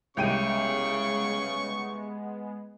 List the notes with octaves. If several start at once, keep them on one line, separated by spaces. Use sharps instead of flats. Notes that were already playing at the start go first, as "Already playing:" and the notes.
C2 C#3 G#3 B3 G5 C#6 D#7